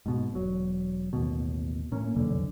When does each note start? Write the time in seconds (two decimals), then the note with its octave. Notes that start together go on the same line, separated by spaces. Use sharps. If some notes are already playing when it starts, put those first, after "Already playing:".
0.06 G#2 B2
0.32 E1 F#3
1.13 A1 D#2 B2
1.92 A2 A#3 C#4
2.15 F1 B1 E2 D3